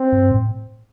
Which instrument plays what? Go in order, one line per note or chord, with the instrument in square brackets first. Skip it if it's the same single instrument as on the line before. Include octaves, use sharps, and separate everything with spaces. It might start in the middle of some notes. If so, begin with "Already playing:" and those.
Already playing: [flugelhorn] C4
[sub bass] G2
A2